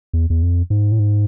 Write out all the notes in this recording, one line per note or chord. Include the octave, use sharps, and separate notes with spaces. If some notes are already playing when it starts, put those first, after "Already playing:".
E2
E2
F2
G#2
A2
G#2